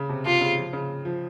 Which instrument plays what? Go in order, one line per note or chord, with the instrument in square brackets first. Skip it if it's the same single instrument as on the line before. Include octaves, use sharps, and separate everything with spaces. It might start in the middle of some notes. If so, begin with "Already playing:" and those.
Already playing: [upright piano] C#3
C3
[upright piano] C3 [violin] F4
[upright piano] C#3
F3
C#3
F3